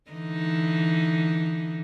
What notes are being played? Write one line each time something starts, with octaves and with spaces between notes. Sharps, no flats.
D3 E3 D#4